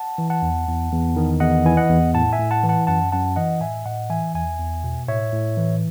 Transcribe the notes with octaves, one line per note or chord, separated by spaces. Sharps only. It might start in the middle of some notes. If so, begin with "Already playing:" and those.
Already playing: F#5 A5
E3
F#5 A5
E2
E2
E2
D#3
E2 D#5 F#5
E3 G#5
D#5 F#5
E2
A2 F#5 A5
E5 G#5
A2
F#5 A5
E3
F#5 A5
F#2 F#5 A5
F#2 F#5 A5
E3 D#5 F#5
A2 E5 G#5
A2 D#5 F#5
E3 E5 G#5
E2 E5 G#5
E2
B2
A2 C#5 E5
A2
E3